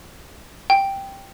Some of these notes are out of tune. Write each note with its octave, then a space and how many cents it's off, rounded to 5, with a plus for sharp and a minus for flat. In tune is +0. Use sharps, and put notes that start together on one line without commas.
G5 +0